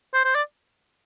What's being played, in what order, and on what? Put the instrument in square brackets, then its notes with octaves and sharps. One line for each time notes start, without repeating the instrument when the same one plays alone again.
[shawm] C5
C5
D5